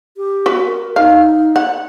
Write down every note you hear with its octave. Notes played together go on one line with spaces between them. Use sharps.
G4
F#4 B4
A#4
D#4 F5
F#5